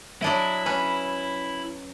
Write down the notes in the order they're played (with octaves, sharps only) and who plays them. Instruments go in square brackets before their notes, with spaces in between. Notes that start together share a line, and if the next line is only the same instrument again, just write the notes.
[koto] F#3 D4 D#5 [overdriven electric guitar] E4
[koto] C#4 B4